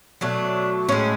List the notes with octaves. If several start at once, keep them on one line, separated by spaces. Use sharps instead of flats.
B2 F#3 A3 D4
A2 G#3 C#4